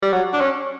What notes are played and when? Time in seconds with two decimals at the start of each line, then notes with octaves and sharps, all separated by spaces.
0.02 G3
0.13 F#3
0.34 D4
0.41 C#4